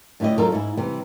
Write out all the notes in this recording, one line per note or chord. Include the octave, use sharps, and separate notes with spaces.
A2 D3 E4 G4 D#5
F#3 D#4 F4 A4 A#4
G#2 E4
C3 E3 G3